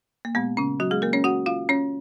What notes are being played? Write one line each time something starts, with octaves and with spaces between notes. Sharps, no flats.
A#3
A#2 G#3 B3
C#3 C#4
F#3 F#4
G#3 G#4
A#3 A#4
C#4 C#5
F#4 F#5
F4 F5
C#4 C#5